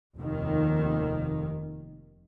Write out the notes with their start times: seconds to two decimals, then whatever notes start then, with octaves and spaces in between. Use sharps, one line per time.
0.17 F1 D#2 D#3